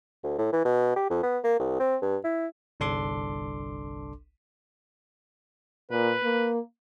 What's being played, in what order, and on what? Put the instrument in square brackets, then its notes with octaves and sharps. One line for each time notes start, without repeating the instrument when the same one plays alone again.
[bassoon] D2
A2
E3
B2
G4
F2
B3
A#3
C2
C4
G2
E4
[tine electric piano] G1 C2 D4 A4 C6 D6
[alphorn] A#2 [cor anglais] B4
[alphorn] A#3